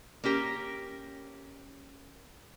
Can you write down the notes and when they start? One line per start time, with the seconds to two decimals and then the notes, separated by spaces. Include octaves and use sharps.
0.24 A#3 C#4 G4 A#4